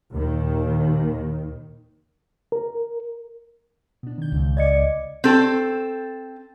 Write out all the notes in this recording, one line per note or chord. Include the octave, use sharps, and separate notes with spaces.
D#2 A#2 D#3
A#4
B2 D4
D#3 G6
C#2
D5 D#5 D6 G#6 C#7
C4 A4